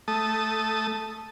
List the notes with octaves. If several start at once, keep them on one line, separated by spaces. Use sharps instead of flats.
A3 A5 D#6